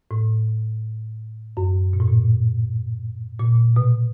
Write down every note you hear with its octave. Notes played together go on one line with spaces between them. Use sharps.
A2
F#2
A#2
A2
A#2
A#2
B2